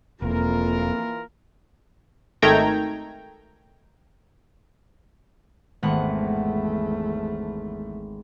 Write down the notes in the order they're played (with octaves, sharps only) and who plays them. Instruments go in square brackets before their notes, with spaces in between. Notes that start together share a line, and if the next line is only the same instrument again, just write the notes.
[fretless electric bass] E1 [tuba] F2 [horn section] E3 F4 A#4 [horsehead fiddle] A#3
[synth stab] G#1 D#3 A3 G5 A#5 G#6
[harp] G#1 B3 F#5 [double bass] E2 A3